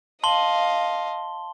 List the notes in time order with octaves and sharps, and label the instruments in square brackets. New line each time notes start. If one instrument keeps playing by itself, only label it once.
[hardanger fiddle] D#5 F5 [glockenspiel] A5 C6 G7